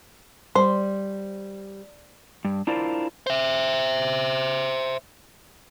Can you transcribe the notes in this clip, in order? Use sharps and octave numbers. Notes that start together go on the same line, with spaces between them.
G3 C5
G2
D4 E4 F4 A#4 C5 D5
C5 E5